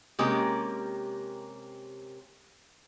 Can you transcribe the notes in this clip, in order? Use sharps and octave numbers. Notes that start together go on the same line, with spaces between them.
C3 G#3 A#3 C#4 G4 A#4